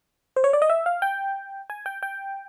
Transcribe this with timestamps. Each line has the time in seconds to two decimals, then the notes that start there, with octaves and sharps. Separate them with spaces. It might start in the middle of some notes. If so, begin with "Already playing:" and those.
0.36 C5
0.44 C#5
0.53 D5
0.62 D#5
0.70 E5
0.86 F5
1.02 G5
1.70 G#5
1.86 G5
2.03 G5